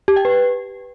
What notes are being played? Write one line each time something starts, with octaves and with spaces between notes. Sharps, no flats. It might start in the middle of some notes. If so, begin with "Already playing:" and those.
G4
G5
B4